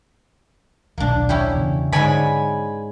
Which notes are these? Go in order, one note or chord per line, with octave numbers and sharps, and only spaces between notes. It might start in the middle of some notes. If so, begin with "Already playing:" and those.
D#1 B1 A2 A#3 D4
C#4 E4 G4
E2 C#3
G#2 D3 C#5 D5 G#5 B5